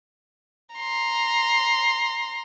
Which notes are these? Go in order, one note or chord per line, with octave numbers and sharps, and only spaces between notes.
A#5 C6